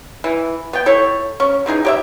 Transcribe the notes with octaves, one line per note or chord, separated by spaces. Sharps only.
E3
B3 G5
E4 A4 C#5
C#4
D3 E3 D#4 G#4
G4 C#5 E5